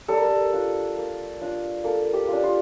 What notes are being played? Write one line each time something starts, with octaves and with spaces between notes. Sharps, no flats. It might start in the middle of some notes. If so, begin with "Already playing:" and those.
G3 A4
A#4
A4
D4 F4
A#3
D4 F4
A#3 A4
G4
D4 F4
F4